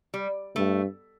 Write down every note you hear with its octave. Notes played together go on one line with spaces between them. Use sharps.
G3
G2 A3